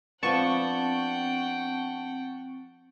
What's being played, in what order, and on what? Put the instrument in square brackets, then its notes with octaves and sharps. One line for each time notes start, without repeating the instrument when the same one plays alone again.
[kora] F3 B3 D4 [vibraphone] C4 [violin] F#5 G5 [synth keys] A5 C#6